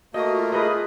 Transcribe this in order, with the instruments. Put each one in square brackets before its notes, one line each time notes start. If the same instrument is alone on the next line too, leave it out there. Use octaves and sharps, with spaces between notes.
[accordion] A3 A#3 [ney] F#4 [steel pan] D#5
[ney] F4
[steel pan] G#4 B4 D#5